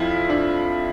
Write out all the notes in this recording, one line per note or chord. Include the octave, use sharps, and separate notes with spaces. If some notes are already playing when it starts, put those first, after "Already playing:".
Already playing: F2 F3 E4 F4
D4